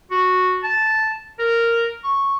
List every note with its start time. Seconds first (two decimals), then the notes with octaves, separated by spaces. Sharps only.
0.11 F#4
0.63 A5
1.39 A#4
2.04 C#6